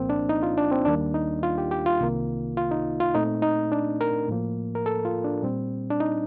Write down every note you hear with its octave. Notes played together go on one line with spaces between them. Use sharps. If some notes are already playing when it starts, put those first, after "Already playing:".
Already playing: C2 A#2 F3 A#3 C4
D4
D#4
F4
D4
C4
D#2 D#3 G3 A#3 D4
D#4
F4
G4
G4
F4
C2 C3 D#3 A#3
F4
D#4
F4
A#2 A3 C4 D#4
D#4
D4
A#4
A2 F3 A#3
A#4
A4
F4
D4
A#2 G3 C4
D4
D#4